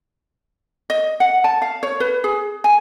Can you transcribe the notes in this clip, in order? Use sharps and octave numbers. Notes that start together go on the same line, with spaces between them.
D#5
F#5
A5
F5
C#5
B4
G#4
G#5